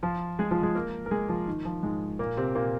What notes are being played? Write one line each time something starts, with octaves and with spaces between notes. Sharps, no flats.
F3 F4
G#3 G#4
F3 F4
G#3 G#4
A#3 A#4
A#4
G#3 G#4
F3 F4
D#3
F3
G#2 G#3
A#2 A#3
C3 C4
A#2 A#3